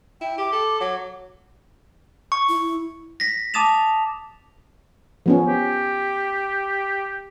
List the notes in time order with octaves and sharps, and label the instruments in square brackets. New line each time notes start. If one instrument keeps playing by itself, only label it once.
[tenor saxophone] E4 [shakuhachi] G5
[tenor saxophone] G4 [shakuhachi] D6
[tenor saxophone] A4
F#3
[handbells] C#6
[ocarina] E4
[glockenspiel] A#6 B6
A5 D6 D#6 A6 E7 F7
[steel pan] F3 B3 C#4
[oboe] G4